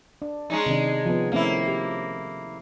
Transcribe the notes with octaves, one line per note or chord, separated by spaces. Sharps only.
D4
G#3 C#4 D#4
C3 D#3 D4
F3 B3
A3 A#3 C4 C#4 E4
G4